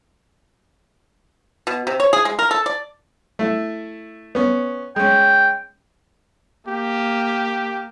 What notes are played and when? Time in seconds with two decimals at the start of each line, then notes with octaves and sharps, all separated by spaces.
1.67 B2
1.87 C3
2.00 C#5
2.13 G#4
2.25 G#3
2.39 A#4
2.51 A4
2.66 D5
3.39 A3 E4
4.35 B3 C#4
4.96 G#3 C#4 G5
6.68 A#3 G4